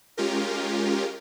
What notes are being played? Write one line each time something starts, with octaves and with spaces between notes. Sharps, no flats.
G#3 C#4 F4 G4 A#4